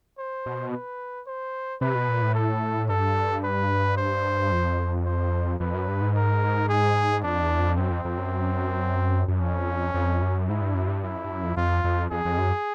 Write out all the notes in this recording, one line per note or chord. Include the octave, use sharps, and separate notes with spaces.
C5
B2
B4
C5
C3 B4
B2
A#2
A2
A4
G2 A4
B4
C5
F2
C5
F2 B4
F#2
G2
G#2
A#4
G#4
F2 D4
E2
F2
F#2 C4
F2
F2
F#2
F#2
F2 C#4
F2
F#2
G#2 E4
G2
F#2
G2
F#2 E4
F2
G2
F#2
F2
F2 F4
F2
F2 G#4
F2
F#2